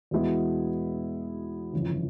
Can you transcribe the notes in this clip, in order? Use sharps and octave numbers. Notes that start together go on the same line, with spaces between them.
E2 B2 G#3 B3 E4
G1 F2 C#3 E3